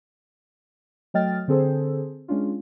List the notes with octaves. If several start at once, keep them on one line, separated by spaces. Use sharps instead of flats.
F#3 A3 D#5 G5 F6 A6
D3 C4 G#4 A4 C5
G#3 C#4 D4 F4